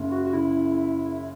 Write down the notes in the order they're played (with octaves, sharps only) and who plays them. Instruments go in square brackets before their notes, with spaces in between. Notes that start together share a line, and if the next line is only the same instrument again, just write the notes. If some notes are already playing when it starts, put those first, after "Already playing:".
Already playing: [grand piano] F#1 F#2
[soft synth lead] F#4
F#4
[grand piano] C#3 [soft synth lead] E4